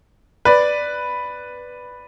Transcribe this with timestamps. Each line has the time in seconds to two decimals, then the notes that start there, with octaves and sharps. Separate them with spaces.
0.45 B4 D5